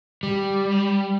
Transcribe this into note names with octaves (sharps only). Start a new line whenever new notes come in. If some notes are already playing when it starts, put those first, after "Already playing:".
G3